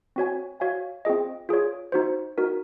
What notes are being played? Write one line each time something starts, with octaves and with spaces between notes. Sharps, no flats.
C4 F#4 C#5 G#5
F#4 C#5 F5 G#5
C4 F4 G#4 D#5
F4 G#4 C#5
D#4 F#4 C5
D#4 F#4 A#4